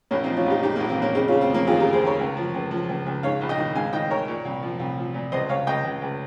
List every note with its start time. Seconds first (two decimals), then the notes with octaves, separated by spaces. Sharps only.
0.11 A#1 A#3 C#4
0.24 C4 D#4
0.28 F3
0.37 C#4 F4
0.46 A#1 D#4 G4
0.63 G#2 D#4 G4
0.76 A#3
0.80 A#1
0.89 C4
0.98 A#1 A#3 C#4
1.15 C#3 C4 D#4
1.28 C#4 F4
1.32 C#3
1.41 C4
1.50 F3 A#3 C#4
1.67 D#2 F4 G#4
1.80 G4 A#4
1.85 C#3
1.93 G#4 C5
2.02 D#2 A#4 C#5
2.19 C#2
2.37 F3
2.54 C#2
2.71 F3
2.89 C#2
3.06 C#2
3.23 G#2 C#5 F5
3.41 A#1
3.49 D#5 G5
3.58 D#3
3.76 G#2 F5 G#5
3.93 D#3 D#5 G5
4.11 D#3 A#4 C#5
4.28 A#2
4.45 C2
4.63 F3
4.79 C2
4.98 F3
5.14 A#2
5.32 C#2 C5 D#5
5.49 C#2 C#5 F5
5.67 C#2 D#5 G5
5.84 C#2
6.02 C#2